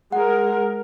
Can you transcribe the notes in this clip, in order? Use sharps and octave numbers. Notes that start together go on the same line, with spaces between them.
G#3 A#4 F#5